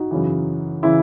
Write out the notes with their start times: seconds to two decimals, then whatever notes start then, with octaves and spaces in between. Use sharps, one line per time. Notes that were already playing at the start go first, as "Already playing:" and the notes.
Already playing: D#4 F#4
0.11 F#2 C#3 E3
0.83 C#3 E3 E4